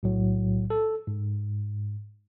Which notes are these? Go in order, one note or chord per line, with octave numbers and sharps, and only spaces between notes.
B1 A2 F#3
A4
G#2